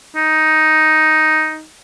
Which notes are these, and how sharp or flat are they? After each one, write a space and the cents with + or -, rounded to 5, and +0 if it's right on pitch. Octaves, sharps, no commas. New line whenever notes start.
D#4 +5